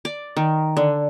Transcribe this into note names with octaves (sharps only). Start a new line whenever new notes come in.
D5
D#3
D3